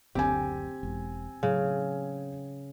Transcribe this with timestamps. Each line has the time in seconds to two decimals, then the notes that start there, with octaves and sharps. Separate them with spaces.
0.15 F#1 D2 D3 C4 G4 G#5
0.83 E1
1.43 A2 C#3 F#3